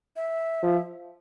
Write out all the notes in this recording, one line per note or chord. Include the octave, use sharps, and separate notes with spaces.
E5
F3